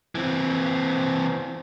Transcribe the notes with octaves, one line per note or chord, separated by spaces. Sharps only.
E3 C4